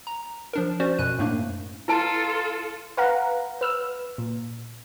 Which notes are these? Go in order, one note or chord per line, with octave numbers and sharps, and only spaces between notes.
A#5
F3 D4 A#4
C#4 F#4 C5 D5
F#2 B2 F#6 D#7
F#2 A2 A3 A#3 D4
E4 F4 A4 B4 A5
B4 F5 F#5 A#5
B4 E6 F6
A#2